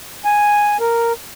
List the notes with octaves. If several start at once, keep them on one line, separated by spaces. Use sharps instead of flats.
G#5
A#4